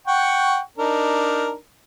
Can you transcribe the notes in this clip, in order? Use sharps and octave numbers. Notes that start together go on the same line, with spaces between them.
F#5 G5 C#6
D4 D#4 A#4